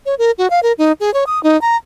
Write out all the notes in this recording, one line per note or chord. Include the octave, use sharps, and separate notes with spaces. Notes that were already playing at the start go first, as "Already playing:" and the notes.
C#5
A#4
F#4
F5
A#4
D#4
G#4
C#5
D#6
D#4
A#5